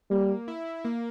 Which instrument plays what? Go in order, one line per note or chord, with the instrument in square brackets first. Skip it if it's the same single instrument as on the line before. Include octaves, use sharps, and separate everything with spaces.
[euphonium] G3 [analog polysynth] A#3
[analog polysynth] E4
A#3